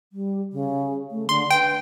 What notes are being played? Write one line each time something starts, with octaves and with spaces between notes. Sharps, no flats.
G3
C#3
A3
D3 C6
B4 G5